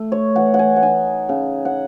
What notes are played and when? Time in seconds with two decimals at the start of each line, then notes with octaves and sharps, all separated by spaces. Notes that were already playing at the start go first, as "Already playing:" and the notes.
Already playing: A3
0.12 C#5
0.35 E3 F#5
0.54 F#5
0.59 G#5
0.76 F#5
0.82 D#4 G#5
1.29 C#3
1.65 F#5